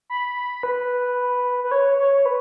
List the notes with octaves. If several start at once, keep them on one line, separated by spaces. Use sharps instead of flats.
B5
B4
B4
C#5
C#5
B4